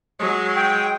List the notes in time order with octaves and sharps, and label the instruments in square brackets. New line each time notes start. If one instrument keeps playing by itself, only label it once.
[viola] F#3 [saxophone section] G#3
[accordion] G5